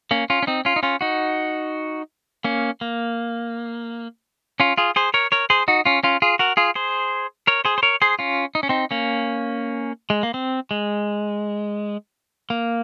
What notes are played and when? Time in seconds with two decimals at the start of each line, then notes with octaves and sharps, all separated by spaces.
0.11 A#3 C#4
0.30 C#4 F4
0.43 C#4
0.47 C4 D#4
0.65 C#4 F4
0.76 D#4
0.83 C#4 F4
1.01 D#4 F#4
2.44 A#3 C#4
2.81 A#3
4.60 C#4 F4
4.78 F4 G#4
4.96 G#4 C5
5.14 A#4 C#5
5.32 A#4 C#5
5.50 G#4 C5
5.68 D#4 F#4
5.85 C#4 F4
6.03 C#4 F4
6.22 F4 G#4
6.39 F#4 A#4
6.57 F4 G#4
6.75 G#4 C5
7.47 A#4 C#5
7.65 G#4 C5
7.78 C5
7.83 A#4 C#5
8.02 G#4 C5
8.19 C#4 F4
8.55 D#4
8.63 C#4
8.69 C4 D#4
8.91 A#3 C#4
10.10 G#3
10.23 A#3
10.34 C4
10.71 G#3
12.50 A#3